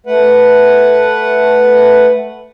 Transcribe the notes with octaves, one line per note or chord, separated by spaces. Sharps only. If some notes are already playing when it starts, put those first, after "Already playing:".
A3 B4 F#5